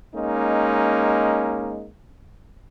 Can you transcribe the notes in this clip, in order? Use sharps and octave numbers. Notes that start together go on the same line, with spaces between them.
G#3 A#3 C#4 D#4